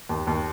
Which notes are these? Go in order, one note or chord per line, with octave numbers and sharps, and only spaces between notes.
D#2
D#2